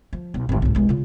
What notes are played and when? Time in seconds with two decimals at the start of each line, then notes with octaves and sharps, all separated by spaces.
0.13 F3
0.34 B1
0.49 G#1 D2
0.62 B1 G#2
0.75 B1 G#3
0.89 C#3 F4